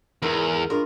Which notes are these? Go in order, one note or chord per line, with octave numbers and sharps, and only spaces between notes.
E2 G#2 A#4
G2 G#3 F4 A#4